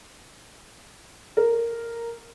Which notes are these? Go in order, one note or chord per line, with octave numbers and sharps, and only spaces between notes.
A#4